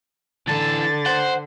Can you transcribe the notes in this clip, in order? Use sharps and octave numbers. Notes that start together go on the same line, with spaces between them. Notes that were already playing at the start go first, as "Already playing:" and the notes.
D3 E3 A4 A6
C5 F#5